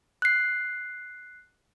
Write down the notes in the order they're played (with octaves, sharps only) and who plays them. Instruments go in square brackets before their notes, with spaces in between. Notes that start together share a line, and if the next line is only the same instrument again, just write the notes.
[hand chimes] F#6 C7